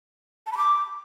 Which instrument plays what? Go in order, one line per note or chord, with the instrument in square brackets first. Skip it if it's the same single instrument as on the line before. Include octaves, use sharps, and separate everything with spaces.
[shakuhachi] A5
B5
D6